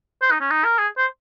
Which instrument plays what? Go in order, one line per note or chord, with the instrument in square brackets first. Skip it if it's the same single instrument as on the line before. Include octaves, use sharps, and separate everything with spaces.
[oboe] C5
D#4
C#4
D#4
A#4
G#4
C5